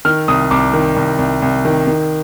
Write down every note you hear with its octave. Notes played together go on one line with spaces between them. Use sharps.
D#3 F6
C2 D#6
C2 D6
D#3
C2
C2
C2
D#3
D#3